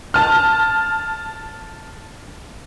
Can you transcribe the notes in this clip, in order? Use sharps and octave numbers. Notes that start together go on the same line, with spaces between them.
A5 F6